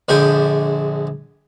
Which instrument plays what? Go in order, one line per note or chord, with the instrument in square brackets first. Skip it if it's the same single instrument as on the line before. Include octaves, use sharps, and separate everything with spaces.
[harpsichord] A#1 D3 G#3 E5 G5 D#6